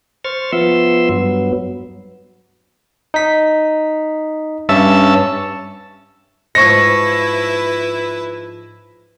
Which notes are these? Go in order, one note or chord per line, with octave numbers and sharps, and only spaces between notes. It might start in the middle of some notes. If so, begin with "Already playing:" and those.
C5 C#6 F6 A6
F3 B3 E5 C6 E6
G2 F#3 B3
D#4 B6
G2 C#4 E5 A5 E6
G#2 F3 E4 B4 D#5 C#6 A#6 C#7